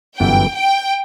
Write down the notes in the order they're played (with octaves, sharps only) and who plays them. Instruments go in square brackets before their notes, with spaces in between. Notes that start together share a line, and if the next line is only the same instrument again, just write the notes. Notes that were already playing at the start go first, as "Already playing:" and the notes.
[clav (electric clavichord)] G1 F#2 E3 B3 [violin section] G5
[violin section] G5